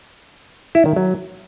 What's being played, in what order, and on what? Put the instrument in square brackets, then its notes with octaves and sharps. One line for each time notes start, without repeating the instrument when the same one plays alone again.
[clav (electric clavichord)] E4
D#3
F#3